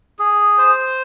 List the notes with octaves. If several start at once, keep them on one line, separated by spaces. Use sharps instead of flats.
G#4
C5